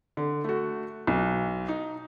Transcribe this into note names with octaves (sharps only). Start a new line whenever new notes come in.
D3
A3 F#4
B1
D#4